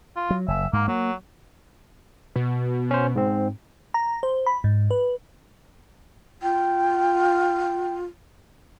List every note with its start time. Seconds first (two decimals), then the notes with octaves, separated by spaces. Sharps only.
0.16 F4
0.30 F#3
0.48 F#1 E5
0.73 G#2 A#3
0.88 F#3 A#3
2.36 B2
2.91 C#4 C5
3.16 G#2 C4
3.94 A#5
4.23 C5
4.46 B5
4.64 G#2
4.91 B4
6.43 F4 G5